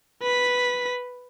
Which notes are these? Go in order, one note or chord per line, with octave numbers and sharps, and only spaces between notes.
B4 B6